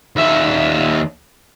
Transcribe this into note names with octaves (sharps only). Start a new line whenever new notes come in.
D#2 E5